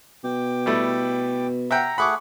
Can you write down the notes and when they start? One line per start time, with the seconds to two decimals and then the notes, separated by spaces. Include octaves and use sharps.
0.24 B2 G5 D6
0.66 G3 A3 E4
1.71 E5 F#5 G5 A#5
1.98 A3 G#4 F#5 B5 C#6 D6